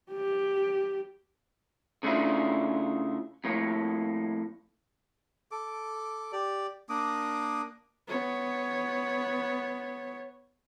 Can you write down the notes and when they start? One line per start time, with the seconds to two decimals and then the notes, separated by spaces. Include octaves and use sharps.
0.12 G4
2.03 C#3 A3 D4 E4 F4
3.44 F2 A2 A#3
5.51 A4 D6
6.32 G4 D5
6.89 A#3 D4 D6 D#6
8.07 B3 C#5